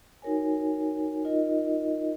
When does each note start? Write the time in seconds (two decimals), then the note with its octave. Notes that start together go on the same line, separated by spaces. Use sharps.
0.22 D#4 F#4 A#4 C#5 G#5
1.25 D#4 F4 A#4 D#5